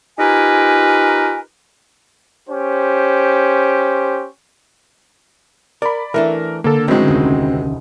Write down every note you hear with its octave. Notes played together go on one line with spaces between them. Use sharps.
D#4 F4 G4 A#4 B4 G#5
C#4 G4 C5
A#4 D5 B5
E3 A3 D4 A#4
D3 A#3 A4
A2 D#3 F#3 G#3 C4 C#4
D#1 C2 D#4